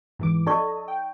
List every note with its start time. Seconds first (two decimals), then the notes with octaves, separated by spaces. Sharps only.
0.19 G#2 E3 D6
0.47 D#4 A4 D5 D#5 C#6
0.88 G5